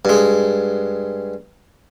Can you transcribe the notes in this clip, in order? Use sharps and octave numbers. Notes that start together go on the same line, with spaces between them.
G2 G#3